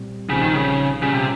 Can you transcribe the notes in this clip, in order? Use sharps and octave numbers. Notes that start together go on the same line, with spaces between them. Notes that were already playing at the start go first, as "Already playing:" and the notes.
Already playing: A#2 G3 C4
A#1 A#2 C#3 G3 C4 D#4
D#3
C#3
A#2 C#3 G3 C#4 F4
C3